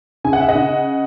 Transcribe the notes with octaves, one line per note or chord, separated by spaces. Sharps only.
C#3 G#5
F#5
E5
D#5 F#5
C#3